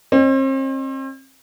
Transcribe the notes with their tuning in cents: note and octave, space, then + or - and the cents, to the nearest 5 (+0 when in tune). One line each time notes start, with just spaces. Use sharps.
C4 +40 D#5 -45